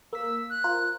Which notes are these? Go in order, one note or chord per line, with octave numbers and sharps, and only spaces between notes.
A#3 E6 B6
F#6
F4 A#4 C5